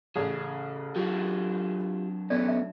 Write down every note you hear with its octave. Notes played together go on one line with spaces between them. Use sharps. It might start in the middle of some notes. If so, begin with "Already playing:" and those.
A1 C#3 G#4
F#3 D4 F4 G4
A3 B3 C#4 D5
E5